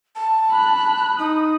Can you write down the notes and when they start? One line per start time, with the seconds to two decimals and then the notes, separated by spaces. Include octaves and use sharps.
0.16 A5
0.52 B5 F#6
1.19 D#4 D#6